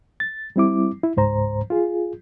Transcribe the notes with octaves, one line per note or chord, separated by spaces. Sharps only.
A6
G3 C4 E4 D6
E4
C#2 G#2 C5 A#5
F4 G#4